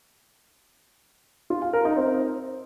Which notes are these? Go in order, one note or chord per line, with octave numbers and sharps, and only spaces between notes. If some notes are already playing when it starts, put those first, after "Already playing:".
F4
F5
A#4
D#4
C4